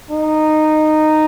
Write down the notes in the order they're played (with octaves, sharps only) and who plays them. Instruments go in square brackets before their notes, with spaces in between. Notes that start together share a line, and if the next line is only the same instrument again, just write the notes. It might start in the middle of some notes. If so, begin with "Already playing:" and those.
[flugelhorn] D#4